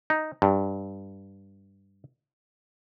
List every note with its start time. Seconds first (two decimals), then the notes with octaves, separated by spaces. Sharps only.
0.10 D#4
0.42 G2